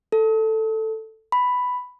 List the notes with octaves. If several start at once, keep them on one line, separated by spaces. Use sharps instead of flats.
A4
B5